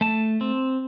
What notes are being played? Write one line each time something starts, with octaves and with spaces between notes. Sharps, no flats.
A3 A5
C4